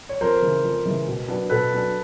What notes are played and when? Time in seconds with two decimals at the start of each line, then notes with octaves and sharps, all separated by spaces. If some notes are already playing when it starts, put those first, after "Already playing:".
0.09 C#5
0.21 F2 A#4 C5
0.42 C#3 E3 G#3
0.64 F2
0.85 C#3 E3 G#3
1.07 B2
1.28 F#3 B3 D4
1.50 B2 A4 B4
1.71 F#3 B3 D4